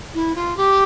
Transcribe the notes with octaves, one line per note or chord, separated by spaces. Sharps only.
E4
F4
G4